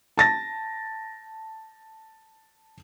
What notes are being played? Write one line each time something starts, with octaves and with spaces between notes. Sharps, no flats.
A5 A6 A#6